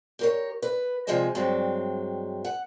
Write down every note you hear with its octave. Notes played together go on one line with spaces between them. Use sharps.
G4 A#4 C#5
B4
C3 F3 G#3 G#4 D#5 E5
G2 F#3 G#3 C4
F#5